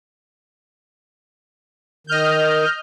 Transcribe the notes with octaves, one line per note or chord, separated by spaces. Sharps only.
D#3 D#5 F6 G6